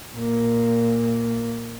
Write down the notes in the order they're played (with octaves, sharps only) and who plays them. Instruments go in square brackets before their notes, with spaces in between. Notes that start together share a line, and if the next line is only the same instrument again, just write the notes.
[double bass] A#2 A#3